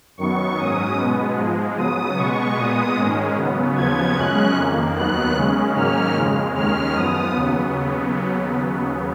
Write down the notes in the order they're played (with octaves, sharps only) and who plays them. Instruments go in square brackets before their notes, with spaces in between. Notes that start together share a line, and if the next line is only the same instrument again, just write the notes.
[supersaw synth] F#2 D#3 F#3 B3 C#6
G#2 F#3 C#4 D#6
B2 G#3 B3
G#2 F3 G#3
C#3 F#3 B3 D#6
B2 G#3 B3 C#6
A#2 G#3 B3 D#6
G#2 D#3 G#3 C#4
C#3 F#3 B3
D#2 C#3 F3 B3 G#6
F#2 C#3 G#3 C#4 F#6
F2 D#3 A#3
D#2 D#3 F#3 B3 F#6
C#3 G#3 C#4
G#2 D#3 F#3 A#3 C#4 F6
F2 C#3 G#3
D#2 D#3 G#3 C#4 F6
F#2 F3 B3 D#6
D#2 C#3 F#3 B3